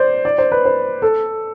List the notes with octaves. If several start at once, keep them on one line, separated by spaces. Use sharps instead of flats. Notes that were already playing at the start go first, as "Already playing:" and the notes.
Already playing: C5 D5
D5
C5
B4
C5
A4